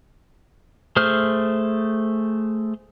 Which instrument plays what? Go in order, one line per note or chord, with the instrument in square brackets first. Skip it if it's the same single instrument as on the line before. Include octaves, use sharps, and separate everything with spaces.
[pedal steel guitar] A3 G#4 C5 F6